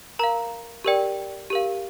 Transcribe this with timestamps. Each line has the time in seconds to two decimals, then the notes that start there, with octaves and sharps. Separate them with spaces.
0.19 A#4 F5 A#5
0.84 G4 A#4 D5 G5
1.50 G4 A#4 F5